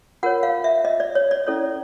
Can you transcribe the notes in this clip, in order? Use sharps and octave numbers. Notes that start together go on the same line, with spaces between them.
F4 A#4 C#5 F#5
F5
E5
D#5
D5
C#5
D5
C#4 E4 A4 C#5